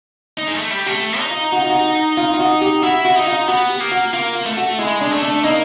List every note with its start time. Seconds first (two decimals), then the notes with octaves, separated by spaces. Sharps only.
0.37 D#4
0.47 G#3
0.54 A3
0.71 G3
0.86 A3 G4
1.19 D#4
1.31 F4
1.52 F#4
1.60 F4
1.70 F#4
1.85 F#4
2.17 F4
2.34 F4
2.39 F#4
2.61 G4
2.82 E4 F#4
3.05 F#4
3.16 D#4
3.27 F4
3.48 B3 F#4
3.70 G4
3.80 A#3
3.92 F#4
4.13 A#3 F4
4.35 F4
4.46 A3
4.57 F#4
4.78 G#3 E4
5.01 D4
5.12 A3
5.22 D4
5.44 A#3 D#4